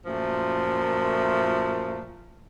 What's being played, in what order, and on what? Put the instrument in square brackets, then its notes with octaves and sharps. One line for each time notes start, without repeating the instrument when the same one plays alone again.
[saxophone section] F#2 A#2 F3 A3